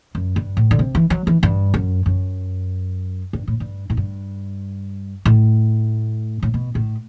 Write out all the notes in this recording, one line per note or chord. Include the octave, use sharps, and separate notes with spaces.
F#2
G2
A2
D3
C3
E3
F#3
E3
G2
F#2
F#2
G2
A2
G2
A2
G2
A2
A2
B2
A2